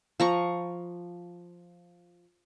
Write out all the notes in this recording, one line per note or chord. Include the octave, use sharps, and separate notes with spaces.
F3 A#5 C#6